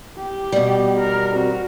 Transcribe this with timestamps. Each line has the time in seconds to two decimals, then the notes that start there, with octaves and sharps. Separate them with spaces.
0.19 G4
0.52 B2 G3
0.99 A#4
1.33 C4 F#4